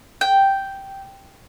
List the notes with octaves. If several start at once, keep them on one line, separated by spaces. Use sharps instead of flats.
G5